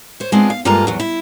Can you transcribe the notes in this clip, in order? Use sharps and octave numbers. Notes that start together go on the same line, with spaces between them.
C5 C#5
G#3 B3 C4 D4 F4
F5
G2 G#3 A#3 F4 A4 A#5
E2 F#3
E4